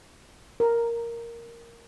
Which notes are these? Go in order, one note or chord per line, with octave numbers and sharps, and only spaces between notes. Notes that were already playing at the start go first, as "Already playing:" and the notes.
A#4